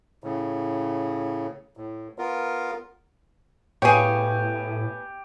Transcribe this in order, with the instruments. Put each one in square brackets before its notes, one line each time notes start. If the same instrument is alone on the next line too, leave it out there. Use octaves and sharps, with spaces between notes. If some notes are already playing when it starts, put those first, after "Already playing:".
[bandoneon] A2 C#3
A2
B3 F4 A#4
[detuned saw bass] A2 [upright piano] B3 F5 G#5 [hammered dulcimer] G4 [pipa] G#4 C#5